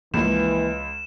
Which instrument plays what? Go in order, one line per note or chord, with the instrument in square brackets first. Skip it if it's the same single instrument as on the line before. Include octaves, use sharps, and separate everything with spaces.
[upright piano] C#2 F4 [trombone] E3 [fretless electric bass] F3 A#3 [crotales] E7